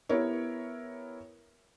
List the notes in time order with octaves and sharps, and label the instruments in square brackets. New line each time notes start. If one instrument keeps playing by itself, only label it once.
[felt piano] B3 E4 G4 A#4 C#5